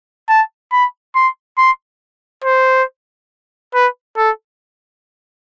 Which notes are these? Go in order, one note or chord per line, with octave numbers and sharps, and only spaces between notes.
A5
B5
C6
C6
C5
B4
A4